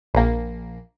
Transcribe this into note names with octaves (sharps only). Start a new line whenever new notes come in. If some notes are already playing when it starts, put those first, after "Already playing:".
A#1 A#3